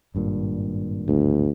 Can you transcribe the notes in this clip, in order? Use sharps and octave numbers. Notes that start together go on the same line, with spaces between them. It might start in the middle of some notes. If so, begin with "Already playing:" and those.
G#1 G2 A#2
D2